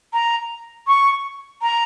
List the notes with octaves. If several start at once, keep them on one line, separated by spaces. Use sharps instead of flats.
A#5
C#6
A#5